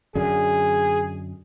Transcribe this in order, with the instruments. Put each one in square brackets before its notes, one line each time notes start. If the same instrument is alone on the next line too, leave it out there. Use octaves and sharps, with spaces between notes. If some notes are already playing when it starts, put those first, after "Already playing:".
[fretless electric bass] F#2 D3 [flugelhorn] G#4